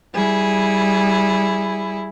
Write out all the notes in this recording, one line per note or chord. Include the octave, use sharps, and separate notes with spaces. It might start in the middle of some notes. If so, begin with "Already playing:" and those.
G3 E4 G#4